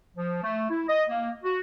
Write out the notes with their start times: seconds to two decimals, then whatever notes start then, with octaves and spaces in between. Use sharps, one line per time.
0.16 F3
0.43 A3
0.70 E4
0.88 D#5
1.09 A#3
1.44 F#4